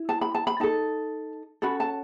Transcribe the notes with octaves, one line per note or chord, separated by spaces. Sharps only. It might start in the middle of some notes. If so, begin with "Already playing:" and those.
Already playing: E4
A5
B5
A5
B5
D#4 A4 A5
C#4 F#4 A4 B5
A5